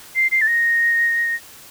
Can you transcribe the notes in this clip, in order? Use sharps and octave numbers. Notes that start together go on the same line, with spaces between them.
C7
C7
A6
A#6